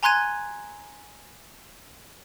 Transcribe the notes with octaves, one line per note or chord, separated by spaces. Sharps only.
G#5 A#5 C6 F#6 G#6 D#7